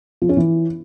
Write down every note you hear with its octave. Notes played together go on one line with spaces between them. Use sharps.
F3
C#4
E3